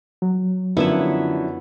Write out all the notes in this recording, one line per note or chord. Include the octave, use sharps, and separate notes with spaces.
F#3
F#2 D3 F3 B3 D4 E4 C#5 E5